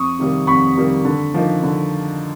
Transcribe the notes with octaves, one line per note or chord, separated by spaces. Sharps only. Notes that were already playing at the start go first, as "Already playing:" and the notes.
Already playing: F2 C#6 D#6
C3 D#3 G3 A#3
F2 B5 C#6
C3 D#3 G3 A#3
D3
F3 A#3 D#4
D3